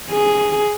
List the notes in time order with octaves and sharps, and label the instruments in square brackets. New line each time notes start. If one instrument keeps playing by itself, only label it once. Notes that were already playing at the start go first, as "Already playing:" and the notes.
[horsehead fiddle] G#4